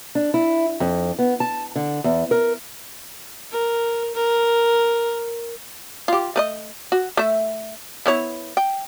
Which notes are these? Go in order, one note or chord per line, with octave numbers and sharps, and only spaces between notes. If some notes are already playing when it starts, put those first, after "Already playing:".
D4
E4
F2
B3
A5
D3
E2
A#4
A#4
A#4
F4 G4
A3 B4 D#5
F#4
A3 E5
B3 E4 C#5
G5